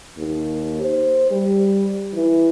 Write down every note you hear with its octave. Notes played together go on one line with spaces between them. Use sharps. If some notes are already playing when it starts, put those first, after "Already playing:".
D#2
C5
G3
E3